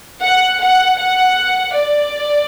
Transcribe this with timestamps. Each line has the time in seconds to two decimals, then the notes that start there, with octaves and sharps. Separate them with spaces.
0.22 F#5
0.60 F#5
0.98 F#5
1.73 D5